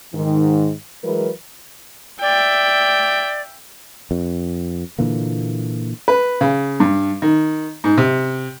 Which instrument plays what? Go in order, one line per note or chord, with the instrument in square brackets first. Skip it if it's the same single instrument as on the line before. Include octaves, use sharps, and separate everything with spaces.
[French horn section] G#2 D#3
E3 F#3 G#3 A#4 B4
[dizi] D5 [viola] E5 G5
[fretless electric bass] F2
A#2 D3 E3 A#3
[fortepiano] B4
C#3
G2
D#3
G#2
C3